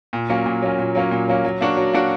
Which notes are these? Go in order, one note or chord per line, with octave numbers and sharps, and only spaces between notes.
A#2
F#3 A#3 C#4
A#2
F#3 A#3 C#4
A#2
F#3 A#3 C#4
A#2
F#3 A#3 C#4
F#3
A#3 D4 F#4
F#3
A#3 D4 F#4